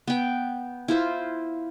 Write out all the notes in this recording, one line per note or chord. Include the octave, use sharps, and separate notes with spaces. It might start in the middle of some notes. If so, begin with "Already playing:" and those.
B3 G5
E4 F4 C5